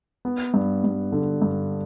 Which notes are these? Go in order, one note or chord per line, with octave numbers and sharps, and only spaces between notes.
B3
G2
G2
D3
G2